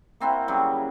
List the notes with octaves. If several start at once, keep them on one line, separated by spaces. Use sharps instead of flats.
A#3 C4 E4 F#4
C#3 F#3 G3